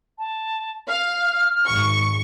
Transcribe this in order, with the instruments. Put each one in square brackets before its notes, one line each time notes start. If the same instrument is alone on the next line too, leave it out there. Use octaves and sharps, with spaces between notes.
[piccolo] A5
[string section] F5 [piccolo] F6
[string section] G#1 C#6